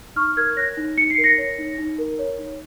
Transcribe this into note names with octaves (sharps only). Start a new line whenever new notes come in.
D#4 C#6 F6
A#4 F6 G#6
C#5 F#6 A#6
D#4
D#4 C#7
C7
A#4
A#6 C#7
C#5
D#4
D#4
A#4
C#5
D#4